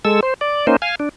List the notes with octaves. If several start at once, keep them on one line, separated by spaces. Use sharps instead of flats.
G#3 A4 E6
C5
D5
A#3 C#4 D#4 C5
F5 G#5
D4